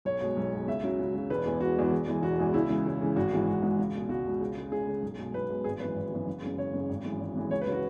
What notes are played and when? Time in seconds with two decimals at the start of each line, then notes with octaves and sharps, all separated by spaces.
0.05 B1 C#5
0.21 B2 G#3
0.37 B1
0.52 B2 G#3
0.68 C#2 E5
0.83 C#3 F#3
0.99 C#2
1.14 C#3 F#3
1.30 E1 B4
1.45 E2 E3 G#3
1.61 E1 F#4
1.76 E2 E3 G#3
1.92 E1
2.07 E2 E3 G#3
2.22 E1 F#4
2.38 E2 E3 G#3
2.54 C#2 E4
2.69 C#3 E3 G#3
2.85 C#2
3.01 C#3 E3 G#3
3.16 G#1 F#4
3.32 G#2 E3 G#3
3.47 G#1 F#4
3.63 G#2 E3 G#3
3.79 C#2
3.94 B2 G#3
4.09 C#2 F#4
4.25 B2 G#3
4.41 C#2
4.57 C#3 G#3
4.72 C#2 G#4
4.87 C#3 G#3
5.02 B1
5.19 B2 G#3
5.34 B1 B4
5.49 B2 G#3
5.64 G#1 G#4
5.80 F#2 E3 G#3 B4
5.96 G#1
6.12 F#2 E3 G#3
6.27 F#1
6.42 F#2 C#3 G#3
6.58 F#1 C#5
6.74 F#2 C#3 G#3
6.90 G#1
7.05 F#2 E3 G#3
7.20 G#1
7.35 F#2 E3 G#3
7.51 C#2 C#5
7.61 B4
7.67 C#3 F#3
7.72 F#4